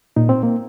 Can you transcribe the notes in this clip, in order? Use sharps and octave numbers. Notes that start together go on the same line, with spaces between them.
A#2 D#4
C4
A#3